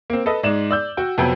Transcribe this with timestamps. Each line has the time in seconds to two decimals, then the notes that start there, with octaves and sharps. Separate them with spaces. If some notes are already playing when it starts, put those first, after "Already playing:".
0.10 A#3 C4
0.26 A4 B4 D#5
0.43 G#2 G#3 D5 E7
0.71 D5 E6 G6
0.97 F#4 G5
1.18 F2 C3 F#3 B3 G5